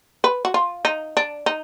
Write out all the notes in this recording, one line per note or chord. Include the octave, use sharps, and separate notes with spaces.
B4
F#4
F4
D#4
D4
D#4